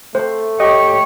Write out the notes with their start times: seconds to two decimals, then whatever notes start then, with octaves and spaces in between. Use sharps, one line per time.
0.15 A3 C5
0.60 G4 C#5 D#5